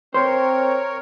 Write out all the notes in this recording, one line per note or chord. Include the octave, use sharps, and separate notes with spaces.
C4 A#4 C5 C#5